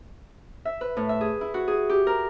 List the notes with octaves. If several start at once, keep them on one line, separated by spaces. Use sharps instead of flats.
E5
B4
A2
E5
G#4
E4
F#4
G#4
G4
A#4